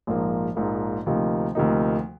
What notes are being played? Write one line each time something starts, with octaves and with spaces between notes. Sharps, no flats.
A#1 G#2 F3 A#3
A#1 G#2 F3 A#3
D2 C3 F3 A#3 D#4
D2 C3 F3 A#3 D#4